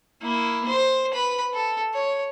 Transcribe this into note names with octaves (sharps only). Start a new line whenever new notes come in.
A#3 E4
C5
B4 B5
A4
C#5